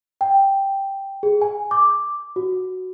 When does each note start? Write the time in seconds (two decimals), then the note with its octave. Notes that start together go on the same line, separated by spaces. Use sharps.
0.21 G5
1.23 G#4
1.42 G#5
1.71 D6
2.36 F#4